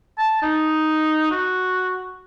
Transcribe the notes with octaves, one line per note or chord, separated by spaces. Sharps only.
A5
D#4
F#4